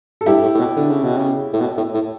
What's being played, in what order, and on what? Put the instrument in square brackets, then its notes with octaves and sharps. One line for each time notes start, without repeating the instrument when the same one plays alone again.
[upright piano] A4
[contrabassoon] G2 [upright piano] E4 G4
[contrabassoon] A2
A2
B2
D3
C#3
B2
C#3
A2
B2
A2
A2